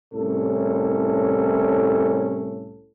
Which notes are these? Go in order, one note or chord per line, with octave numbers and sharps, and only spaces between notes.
C2 A2 C#4 A4